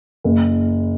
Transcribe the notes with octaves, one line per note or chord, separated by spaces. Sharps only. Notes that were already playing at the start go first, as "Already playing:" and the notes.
F#1